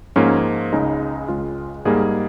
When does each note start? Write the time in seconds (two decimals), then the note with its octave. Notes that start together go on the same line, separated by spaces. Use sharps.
0.16 G#2 F3 A#3 C#4
0.73 C#2 C#3 G#3 D#4
1.28 C#2 C#3 G#3 F4
1.85 G#2 G3 A#3 G#4